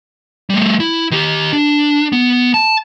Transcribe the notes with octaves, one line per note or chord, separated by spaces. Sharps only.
G3 A3
E4
D#3 G4
D4
B3
A5